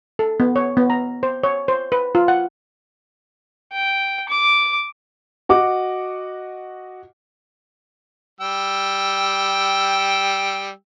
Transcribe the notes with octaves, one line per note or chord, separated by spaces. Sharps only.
A4
B3
C#5
B3
A#5
C5
C#5
C5
B4
F4
F#5
G5
D6
F#4 D#5 F#5 D6
G3 G5 E6